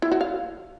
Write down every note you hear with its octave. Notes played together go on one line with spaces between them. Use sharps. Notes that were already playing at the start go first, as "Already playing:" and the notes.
E4
F#4
F5